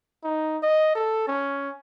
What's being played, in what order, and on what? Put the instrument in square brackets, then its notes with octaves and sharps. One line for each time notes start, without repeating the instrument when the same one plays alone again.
[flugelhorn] D#4
D#5
A4
C#4